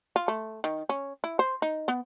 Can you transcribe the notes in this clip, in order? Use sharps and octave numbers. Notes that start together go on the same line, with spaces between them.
F4
A3
D#3
C#4
E4
C5
D#4
B3